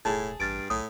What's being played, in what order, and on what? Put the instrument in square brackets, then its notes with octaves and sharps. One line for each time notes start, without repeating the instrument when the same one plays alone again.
[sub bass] E1 [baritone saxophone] A2 [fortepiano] G#4 A5
[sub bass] A1 [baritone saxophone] G2 [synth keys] F6 A6 D7
[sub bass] B1 [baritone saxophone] A2 [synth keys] D#6